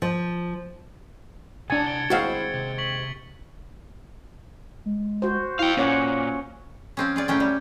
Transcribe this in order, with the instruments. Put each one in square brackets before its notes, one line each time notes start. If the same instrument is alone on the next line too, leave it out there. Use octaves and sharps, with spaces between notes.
[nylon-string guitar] F3
[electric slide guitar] C3 F#5 A#5 [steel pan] D4 G#5 [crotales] G#6 A6 C#7
[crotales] D7 G7
[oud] D#2 G#3 C4 [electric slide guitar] E4 [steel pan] F#4 F5
[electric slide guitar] C3
[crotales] C#6 B6 F#7
[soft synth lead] G#3
[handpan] F#4 C5
[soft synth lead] E4 [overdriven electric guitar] F5 G5
[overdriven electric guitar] A#2 [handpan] C#4 C#5 F#5 [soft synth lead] F5
[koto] F3 C4 C#4
F4 G#4 D5
A2 F#3 C#4 G5
G3